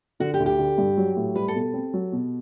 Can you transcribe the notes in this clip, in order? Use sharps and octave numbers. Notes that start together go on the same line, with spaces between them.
D3 F#4
G4
D2
G4
D3
G2
F#3
A2
G3 B4
A4
B2
C4
F#3
B2